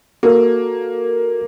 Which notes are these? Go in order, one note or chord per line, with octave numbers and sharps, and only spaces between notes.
A#3 F#4 A4 A#4